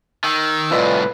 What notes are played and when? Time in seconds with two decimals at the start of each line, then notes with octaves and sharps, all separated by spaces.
0.24 D#3 E6
0.71 C2 A2 F4 B4 D5 D#5